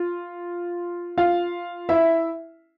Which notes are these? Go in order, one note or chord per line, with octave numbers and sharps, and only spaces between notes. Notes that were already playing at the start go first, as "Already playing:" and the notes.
Already playing: F4
F4 F5
E4 E5